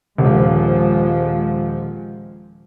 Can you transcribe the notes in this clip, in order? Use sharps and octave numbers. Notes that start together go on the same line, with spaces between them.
D#1 F3 G#3